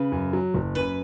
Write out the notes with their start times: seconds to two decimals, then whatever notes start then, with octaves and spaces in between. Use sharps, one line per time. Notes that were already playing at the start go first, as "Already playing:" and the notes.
Already playing: C#3 B4
0.12 F#2
0.33 F#3
0.54 F#1
0.75 F#2 B4